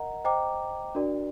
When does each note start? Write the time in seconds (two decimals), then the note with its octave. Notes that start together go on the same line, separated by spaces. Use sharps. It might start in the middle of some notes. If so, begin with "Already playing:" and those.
Already playing: A#4 D#5 F#5 A#5
0.24 C5 D#5 G5 A#5 D6
0.95 D4 F#4 A#4 D5